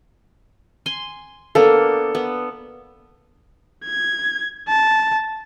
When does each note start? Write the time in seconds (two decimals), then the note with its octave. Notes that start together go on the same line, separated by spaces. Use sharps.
0.86 G#5 C6
1.55 A#3 B3 D4 A4
2.15 B3
3.85 G#6
4.68 A5